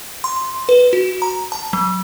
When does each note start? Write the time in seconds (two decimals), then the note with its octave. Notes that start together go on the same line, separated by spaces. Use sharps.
0.24 C6
0.69 B4
0.93 F#4
1.22 A#5
1.52 A5
1.73 F#3